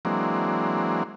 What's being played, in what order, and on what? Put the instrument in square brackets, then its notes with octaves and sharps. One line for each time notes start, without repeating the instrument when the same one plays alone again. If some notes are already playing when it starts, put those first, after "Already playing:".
[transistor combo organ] E3 F#3 G#3 A#3 C4 D4